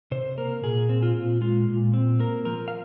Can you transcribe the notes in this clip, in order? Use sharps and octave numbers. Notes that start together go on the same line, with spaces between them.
C3 C5
A#3 A#4
A#2 G#4
C4
F4
A#2
G#3 F4
A#2
C4
A#3 A#4
F3 A#4
F5